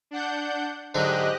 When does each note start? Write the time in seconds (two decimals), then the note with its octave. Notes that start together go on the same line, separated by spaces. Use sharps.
0.11 D4 F#5 G6
0.95 G#2 D3 F#3 F#4 G4 D#5 F#6